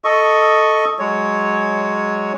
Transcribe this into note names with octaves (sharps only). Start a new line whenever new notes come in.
A4 D#5 C#6
F#3 G#3 C#5